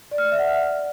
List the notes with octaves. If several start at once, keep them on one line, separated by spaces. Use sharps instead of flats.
D5
F6
D5
E5
F#5